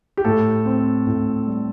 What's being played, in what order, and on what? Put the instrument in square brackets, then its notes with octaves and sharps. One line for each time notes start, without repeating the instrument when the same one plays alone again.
[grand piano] G4
A2 A4
C4
A2
G3